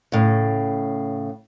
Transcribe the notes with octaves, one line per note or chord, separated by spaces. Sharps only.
A2 C#3